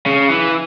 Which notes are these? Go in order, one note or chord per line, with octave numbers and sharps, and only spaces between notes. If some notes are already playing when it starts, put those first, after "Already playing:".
C#3
E3